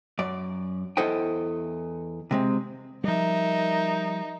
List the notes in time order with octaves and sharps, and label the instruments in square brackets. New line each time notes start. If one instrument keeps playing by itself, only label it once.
[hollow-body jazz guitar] F#2 D5
E2 E4 A4 C5 D#5 G5
C3 G#3 C4
[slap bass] F3 G3 [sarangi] D#4 [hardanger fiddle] A#4 E5